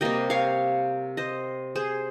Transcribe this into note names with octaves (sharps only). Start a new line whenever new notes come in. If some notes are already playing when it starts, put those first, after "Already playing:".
C3 G3 A#3 D#5 G5
C#5 F5
C5 D#5
G#4 C5